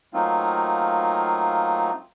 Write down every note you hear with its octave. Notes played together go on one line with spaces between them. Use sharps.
F#3 A3 A#3 C4 D#4 F4